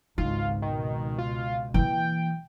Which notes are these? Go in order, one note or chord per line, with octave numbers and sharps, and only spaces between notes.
G#1 C#2 D#4 F4
C#2 B2 D#3
F4
E3 A#3 G5